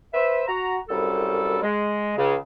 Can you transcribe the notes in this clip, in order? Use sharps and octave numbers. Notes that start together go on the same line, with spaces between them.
B4 C5 E5
F#4 A#5
C2 F#2 G3 A4
G#3
C#2 C#3